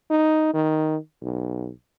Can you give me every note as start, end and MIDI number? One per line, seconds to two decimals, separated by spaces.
0.11 0.50 63
0.53 0.97 51
1.22 1.70 35